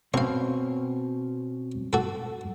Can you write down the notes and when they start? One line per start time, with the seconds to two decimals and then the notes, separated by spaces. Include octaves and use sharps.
0.14 B2 C4 C#4 F5 C#6
1.93 F#4 A4